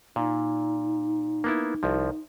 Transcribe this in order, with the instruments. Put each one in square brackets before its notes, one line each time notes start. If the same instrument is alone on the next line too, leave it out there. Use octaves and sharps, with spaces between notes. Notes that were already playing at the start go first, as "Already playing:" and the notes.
[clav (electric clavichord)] A#2 [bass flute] D#4
[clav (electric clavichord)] A#3 B3 E4
C2 F3